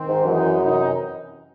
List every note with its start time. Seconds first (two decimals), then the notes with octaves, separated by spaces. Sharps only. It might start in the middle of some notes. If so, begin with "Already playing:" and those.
Already playing: D#3 C4
0.08 G#2
0.25 F#2 E3 G#3 D#4
0.60 C3 E3 C4 D#4